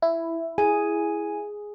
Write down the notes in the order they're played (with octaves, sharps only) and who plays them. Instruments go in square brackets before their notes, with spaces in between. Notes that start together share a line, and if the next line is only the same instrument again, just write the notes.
[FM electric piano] E4
[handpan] G#4 [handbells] G#5